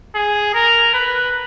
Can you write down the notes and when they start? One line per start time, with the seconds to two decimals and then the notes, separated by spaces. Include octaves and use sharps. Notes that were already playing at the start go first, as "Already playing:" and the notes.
0.15 G#4
0.54 A#4
0.94 B4